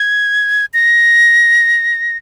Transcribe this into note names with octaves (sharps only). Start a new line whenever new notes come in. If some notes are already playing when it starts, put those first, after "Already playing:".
Already playing: G#6
A#6